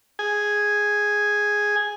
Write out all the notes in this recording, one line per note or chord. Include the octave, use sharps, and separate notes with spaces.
G#4 G#5